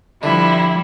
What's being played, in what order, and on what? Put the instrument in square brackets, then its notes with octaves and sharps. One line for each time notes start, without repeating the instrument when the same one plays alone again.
[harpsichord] D3 [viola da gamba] F3 G3 [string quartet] E4 [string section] B5